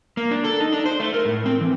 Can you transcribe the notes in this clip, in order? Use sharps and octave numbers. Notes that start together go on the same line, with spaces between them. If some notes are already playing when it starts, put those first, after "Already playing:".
A#3
D4
A4
D#4
D4
C5
A3
A#4
A2
C4
E3